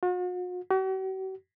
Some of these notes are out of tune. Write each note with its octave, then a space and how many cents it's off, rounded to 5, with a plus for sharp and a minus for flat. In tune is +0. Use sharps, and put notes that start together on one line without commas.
F#4 -45
F#4 +45